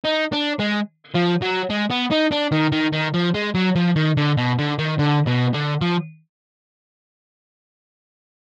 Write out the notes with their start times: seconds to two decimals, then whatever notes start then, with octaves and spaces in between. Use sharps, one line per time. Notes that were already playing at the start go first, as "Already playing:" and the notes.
0.04 D#4
0.32 D4
0.59 G#3
1.14 F3
1.42 F#3
1.70 G#3
1.90 B3
2.11 D#4
2.31 D4
2.52 D#3
2.72 D#3
2.93 D#3
3.14 F3
3.35 G#3
3.55 F#3
3.76 F3
3.96 D#3
4.17 D3
4.37 B2
4.58 D3
4.79 D#3
4.99 D3
5.27 B2
5.54 D3
5.82 F3